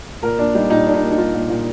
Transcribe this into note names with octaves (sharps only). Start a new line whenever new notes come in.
A#2 A#4
A#3 D4
G3 D#4
A#2 D#4
A#2 D4
D#4
A#3
D#4
G3 F4
A#2
A#2